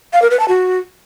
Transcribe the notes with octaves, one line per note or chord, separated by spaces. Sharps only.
F5
A#4
B4
A5
F#4